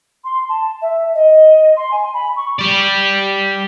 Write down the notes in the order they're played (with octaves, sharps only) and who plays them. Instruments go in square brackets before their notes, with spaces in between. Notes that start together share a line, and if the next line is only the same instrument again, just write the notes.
[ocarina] C6
A5
E5
D#5
C6
G#5
B5
C#6
[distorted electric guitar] G4 D5